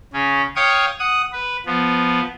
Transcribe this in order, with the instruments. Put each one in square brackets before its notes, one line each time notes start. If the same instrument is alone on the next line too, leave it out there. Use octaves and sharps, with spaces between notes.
[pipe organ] C#3 C#4
C#5 F5 G5 C#6 D#6
F#5 D#6
B4
F3 B3